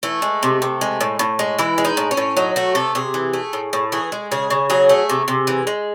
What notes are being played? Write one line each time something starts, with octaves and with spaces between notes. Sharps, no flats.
E3 A3
G#3
C3
C3
G#3
A2
A2
G#3
E3 E4
G#3
D#4
A2
C#4
A2
F#3 D#4
A3 F#4
C3 A4
C3 G#4
E3
A3
A2
A2
E3 G#4
G#3
C#3 G#4
C#3
F#3 G#4
A3
C3
C3
E3
G#3